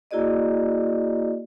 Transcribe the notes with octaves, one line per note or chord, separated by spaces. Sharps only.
A#3 E4 F#4 G#4 D5 D#5